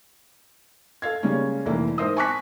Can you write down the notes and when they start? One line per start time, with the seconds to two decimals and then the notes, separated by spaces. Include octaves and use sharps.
1.02 A4 F5 G#6
1.23 C#3 G3 G#3 A#3 C#4
1.65 F1 C2 E3 A3 A#3
1.98 G#2 A#4 C5 E5 D#6
2.17 G#5 A5 C#6 D6 F#6 B6